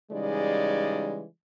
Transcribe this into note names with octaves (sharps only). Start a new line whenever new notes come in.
C#3 E3 G3 G#3 D#4 D5